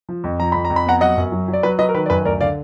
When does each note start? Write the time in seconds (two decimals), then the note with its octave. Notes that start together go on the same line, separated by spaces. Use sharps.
0.09 F3
0.24 F2
0.40 F3 A#5
0.52 F2 B5
0.65 A#5
0.70 F2
0.76 B5
0.86 B3 F#5 A#5
1.01 F#3 D#5 F#5
1.17 F#2
1.32 F#3
1.48 F#3
1.53 D5
1.63 F#3 B4
1.79 F#3 B4 D#5
1.89 A#4
1.94 D#3 B4
2.06 D5
2.10 F#2 B4
2.25 D2 A#4 D5
2.40 D3 D5 F5